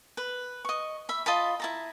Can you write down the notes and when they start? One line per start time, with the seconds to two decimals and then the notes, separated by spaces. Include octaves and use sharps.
0.17 B4
0.65 D#5 C#6
1.09 E5 B5
1.26 F4 D#5 A5 B5
1.60 E4 A5 A#5